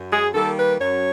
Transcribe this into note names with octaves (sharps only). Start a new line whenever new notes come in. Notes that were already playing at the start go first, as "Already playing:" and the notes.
Already playing: F#2
G#4
D#3 G3 A#3 A4
B4
F#2 C#5